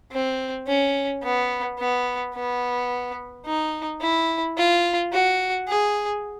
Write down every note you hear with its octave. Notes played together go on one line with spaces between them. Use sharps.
C4
C#4
B3
B3
B3
D#4
E4
F4
F#4
G#4